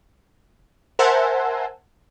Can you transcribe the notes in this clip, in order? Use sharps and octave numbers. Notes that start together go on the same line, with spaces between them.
A#4 C5 E5 F#5 G#5 A5